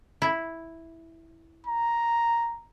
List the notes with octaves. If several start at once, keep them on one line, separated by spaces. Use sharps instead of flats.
E4
A#5